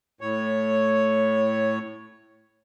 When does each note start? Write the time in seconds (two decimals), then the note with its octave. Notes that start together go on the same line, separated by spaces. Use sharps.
0.21 A2 C#5